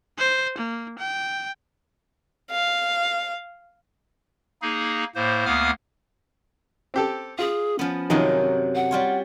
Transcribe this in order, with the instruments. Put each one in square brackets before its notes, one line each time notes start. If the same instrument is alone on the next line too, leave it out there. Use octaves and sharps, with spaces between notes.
[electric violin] C5
A#3
G5
[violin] F5
[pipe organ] A#3 D#4 G#4
A2 A#3 C5
D2 A#3 B3 F5 D#6 F6
[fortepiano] C4 G4 A4
[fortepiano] F4 [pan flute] G#4
[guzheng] F3 B3 [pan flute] C#4
[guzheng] F#2 C3 F#3 [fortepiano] D#3 F3 D#4
[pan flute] F#5
[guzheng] G3 F4 C#5